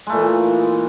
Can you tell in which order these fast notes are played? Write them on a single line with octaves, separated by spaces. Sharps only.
G#3 A3 A#2 E3